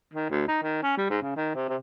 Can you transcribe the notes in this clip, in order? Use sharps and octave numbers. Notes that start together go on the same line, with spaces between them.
D#3
D2
D#4
D#3
C#4
G3
G#2
C#3
D#3
C3
C3